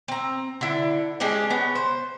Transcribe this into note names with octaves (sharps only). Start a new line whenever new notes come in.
C4 A#5
D3 E4
G#3 C#4 D4 G4
B3 C#4
C5